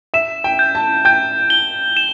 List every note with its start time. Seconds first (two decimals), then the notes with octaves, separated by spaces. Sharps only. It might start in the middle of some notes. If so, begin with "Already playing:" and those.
0.14 E5 E7
0.44 G5
0.59 G6
0.75 A5
1.05 G5 G6
1.50 G7
1.97 E7